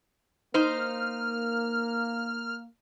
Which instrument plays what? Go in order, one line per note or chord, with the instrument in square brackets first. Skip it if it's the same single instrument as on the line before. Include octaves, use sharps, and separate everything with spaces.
[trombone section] A#3 [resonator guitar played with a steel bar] D#4 C5 [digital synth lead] F6